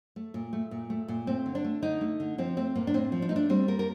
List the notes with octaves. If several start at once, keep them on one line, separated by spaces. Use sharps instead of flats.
A3
A#2
A3
A#2
A3
A#2
A3 C4
D3
D4
A3
D3 D#4
A3
D3
F3 C4
A3 C4
A2 A#3
D4
A2 C4
F3
D4
A3 D#4
D4
G3 C4
A#3 A#4
A#4